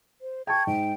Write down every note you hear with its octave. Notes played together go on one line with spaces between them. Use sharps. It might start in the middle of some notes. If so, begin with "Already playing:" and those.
C5
G5 A5 C#6 G#6
G#2 G5